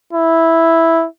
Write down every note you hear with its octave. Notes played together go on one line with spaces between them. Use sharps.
E4